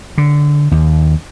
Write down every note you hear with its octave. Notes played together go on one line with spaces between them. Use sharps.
D3
D#2